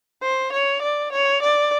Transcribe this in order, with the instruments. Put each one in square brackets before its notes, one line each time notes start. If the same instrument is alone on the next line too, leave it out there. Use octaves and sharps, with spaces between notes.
[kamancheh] C5
C#5
D5
C#5
D5